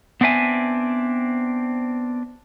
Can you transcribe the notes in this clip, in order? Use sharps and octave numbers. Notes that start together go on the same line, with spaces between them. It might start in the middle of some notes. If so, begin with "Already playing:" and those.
B3 C4 D4 E5 G#5